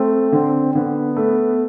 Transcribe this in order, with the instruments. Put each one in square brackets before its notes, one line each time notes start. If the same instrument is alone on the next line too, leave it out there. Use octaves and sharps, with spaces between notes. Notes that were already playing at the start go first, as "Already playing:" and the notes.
Already playing: [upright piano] A3 [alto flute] C4
[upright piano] D3 [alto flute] C4
[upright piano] D3 [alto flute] B3
[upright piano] A3